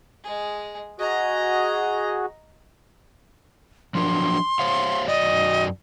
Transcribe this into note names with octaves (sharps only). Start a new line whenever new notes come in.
G#3 G#4
F#4 G#4 D#5 A#5
F3 F#3 D4 C6
C5 C#5 F5
F#2 F#4 D5 D#5